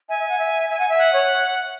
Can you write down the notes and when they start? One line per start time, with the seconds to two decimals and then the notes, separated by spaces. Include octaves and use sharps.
0.08 E5 G#5
0.18 E5
0.28 F#5
0.38 E5
0.69 E5
0.78 F#5
0.89 E5
0.98 F#5
1.13 C#5